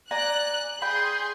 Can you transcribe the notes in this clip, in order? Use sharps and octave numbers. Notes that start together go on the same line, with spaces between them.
D5 G#5 A#5 F#6
G#4 G5 B5 C6 G6